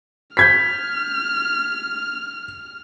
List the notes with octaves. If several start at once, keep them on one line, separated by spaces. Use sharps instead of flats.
F6 G6 G#6 B6